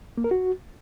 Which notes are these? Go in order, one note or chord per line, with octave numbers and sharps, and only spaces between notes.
A#3
A#4
F#4